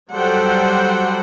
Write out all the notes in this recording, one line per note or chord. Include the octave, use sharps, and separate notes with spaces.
F#3 G3 A4 C5 F#5 G5